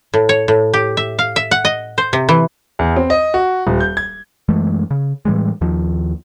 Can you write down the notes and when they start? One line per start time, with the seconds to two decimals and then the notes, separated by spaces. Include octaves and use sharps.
0.14 A2
0.29 C#5
0.48 A2
0.74 G4
0.97 E5
1.19 F5
1.36 E5
1.51 F#5
1.65 D#5
1.98 C5
2.13 C3
2.29 E3
2.79 E2
2.96 C4
3.10 D#5
3.34 F#4
3.67 D#1
3.81 G6
3.97 G#6
4.49 F#2 E3 G#3 A3
4.91 C#3
5.25 A2 E3 G3 G#3
5.61 D#2 D#3 F3